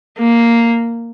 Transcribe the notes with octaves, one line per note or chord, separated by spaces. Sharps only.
A#3